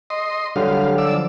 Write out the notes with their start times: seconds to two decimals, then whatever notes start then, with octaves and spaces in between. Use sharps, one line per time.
0.10 D#5 C6
0.56 D3 F#3 G3 F5
0.98 D5 E6
1.12 F3